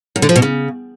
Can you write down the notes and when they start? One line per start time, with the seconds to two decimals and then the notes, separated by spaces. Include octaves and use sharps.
0.16 F#2
0.22 D3
0.29 F3
0.36 B2
0.42 C#3